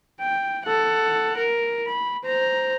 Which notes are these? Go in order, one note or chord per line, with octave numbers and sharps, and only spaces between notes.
G5
A4 F#5
A#4
B5
C5 A#5